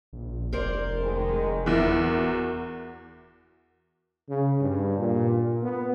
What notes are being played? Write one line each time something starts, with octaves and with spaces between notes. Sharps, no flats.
A#1
F1 A#4 C5 D5
D#3 G#3
E2 E3 B3 E4 A#4
F#4
C#3
G2
A#2
B3